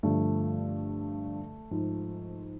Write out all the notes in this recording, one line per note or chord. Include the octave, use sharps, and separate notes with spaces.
G2 D3 F3 A3
G#2 F3